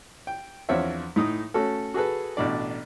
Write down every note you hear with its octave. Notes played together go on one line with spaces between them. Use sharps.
G5
E2 F3 C4 D4 C#5 E5
A2 D#4 D#6
A3 C#4 F#4 A4
F#4 G#4 A4 B4
A1 B2 D4 D5